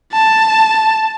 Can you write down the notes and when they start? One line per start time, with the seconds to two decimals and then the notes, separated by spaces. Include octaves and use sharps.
0.13 A5